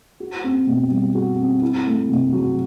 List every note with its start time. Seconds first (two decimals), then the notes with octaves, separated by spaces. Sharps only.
0.20 F#4
0.44 C4
0.67 B2
0.91 G3
1.15 F#4
1.39 C4
1.62 E4
1.86 A3
2.09 C3
2.33 F#3